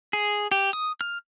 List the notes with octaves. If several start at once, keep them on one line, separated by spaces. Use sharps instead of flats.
G#4
G4
D#6
F6